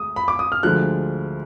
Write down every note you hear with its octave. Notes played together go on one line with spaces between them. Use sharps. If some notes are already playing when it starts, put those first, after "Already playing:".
Already playing: D2 G#3 D#6
B5
D6
D#6
F6
D2 D3 F3 G#3 F#6